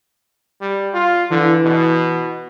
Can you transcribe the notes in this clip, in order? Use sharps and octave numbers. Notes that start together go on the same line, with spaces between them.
G3
F4
D3 E3
B2